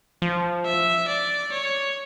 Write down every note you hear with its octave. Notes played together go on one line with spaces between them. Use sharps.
F3
E5
D5
C#5